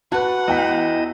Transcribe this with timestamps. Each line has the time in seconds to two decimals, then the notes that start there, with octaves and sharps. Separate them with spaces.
0.12 F#4 B4 F#5 A5 F#6
0.48 E2 E4 D#5 G5 B6